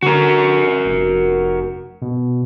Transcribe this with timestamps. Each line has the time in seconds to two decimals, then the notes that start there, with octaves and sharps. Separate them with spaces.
0.03 D3 F#4 A#4
0.85 F1
2.02 B2